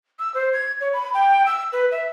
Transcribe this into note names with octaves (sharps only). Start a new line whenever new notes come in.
E6
C5
G#6
C#5
B5
G5
E6
B4
E5